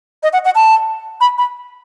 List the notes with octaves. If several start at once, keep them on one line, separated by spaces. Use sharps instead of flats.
D#5
F#5
F#5
A5
B5
B5